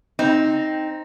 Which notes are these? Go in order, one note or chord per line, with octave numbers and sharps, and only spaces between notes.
C4 D#4